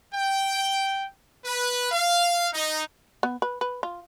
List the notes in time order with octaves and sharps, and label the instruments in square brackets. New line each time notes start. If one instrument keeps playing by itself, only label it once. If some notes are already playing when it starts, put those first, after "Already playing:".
[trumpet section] G5
B4
F5
D#4
[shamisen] B3
B4
B4
F4